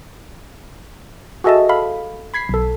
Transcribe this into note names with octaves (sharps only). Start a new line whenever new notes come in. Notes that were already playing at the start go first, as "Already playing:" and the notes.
F#4 G#4 A4 D#5 E5 A5
A4 F5 B5
B5 G#6 B6 C7
B1 A4